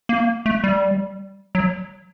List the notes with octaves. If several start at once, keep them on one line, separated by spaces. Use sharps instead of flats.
A#3
A3
G3
F#3